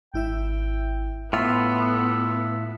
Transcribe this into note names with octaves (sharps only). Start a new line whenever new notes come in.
G#1 E4 E5 G5
A2 B3 F4 A4 E5 B5 C6